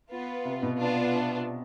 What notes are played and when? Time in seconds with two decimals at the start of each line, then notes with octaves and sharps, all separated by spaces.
0.10 B3 F4 B4
0.45 C3
0.63 B2
0.80 B3 D4 F4